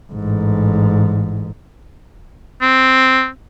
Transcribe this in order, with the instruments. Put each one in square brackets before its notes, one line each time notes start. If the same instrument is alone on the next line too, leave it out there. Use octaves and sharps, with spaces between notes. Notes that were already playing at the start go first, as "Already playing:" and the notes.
[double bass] A1 G#2
[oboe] C4